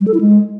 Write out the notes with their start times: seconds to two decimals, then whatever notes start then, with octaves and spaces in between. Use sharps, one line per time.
0.01 G3
0.07 A4
0.14 E4
0.21 G#3